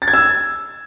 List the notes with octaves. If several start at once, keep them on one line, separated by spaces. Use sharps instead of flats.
A6
G#6
E6